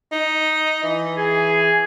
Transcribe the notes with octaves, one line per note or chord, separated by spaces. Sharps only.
D#4
E3
G#4